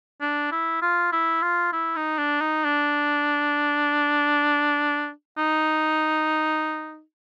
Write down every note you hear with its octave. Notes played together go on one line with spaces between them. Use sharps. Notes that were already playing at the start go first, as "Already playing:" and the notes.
D4
E4
F4
E4
F4
E4
D#4
D4
D#4
D4
D#4